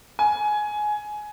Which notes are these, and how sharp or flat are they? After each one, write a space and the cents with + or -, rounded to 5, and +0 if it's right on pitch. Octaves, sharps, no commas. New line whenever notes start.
G#5 +15